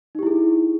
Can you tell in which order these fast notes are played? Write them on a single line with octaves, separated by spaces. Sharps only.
D#4 G4 E4 G#4